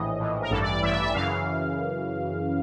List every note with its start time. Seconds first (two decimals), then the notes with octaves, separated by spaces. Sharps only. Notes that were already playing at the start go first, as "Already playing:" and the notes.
Already playing: A#1 A2 E3 D#5
0.19 A#1 A2 E3
0.42 A#4
0.51 A1 G2 E3 A4
0.61 D5
0.72 D5
0.82 A1 G2 E3 E5
0.92 E5
1.03 E5
1.14 F#2 C#3 E3 F5